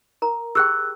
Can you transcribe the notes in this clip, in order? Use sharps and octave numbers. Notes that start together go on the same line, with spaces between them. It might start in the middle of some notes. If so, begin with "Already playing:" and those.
A#4 A#5
G4 G#4 G5 E6 F#6